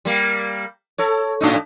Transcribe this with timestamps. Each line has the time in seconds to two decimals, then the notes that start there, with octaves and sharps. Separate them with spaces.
0.05 G3 A#3
0.98 A4 C#5
1.41 A2 D4 D#4